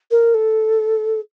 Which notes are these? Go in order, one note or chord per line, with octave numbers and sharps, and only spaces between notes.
A#4
A4